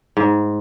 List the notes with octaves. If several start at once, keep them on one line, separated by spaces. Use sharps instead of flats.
G#2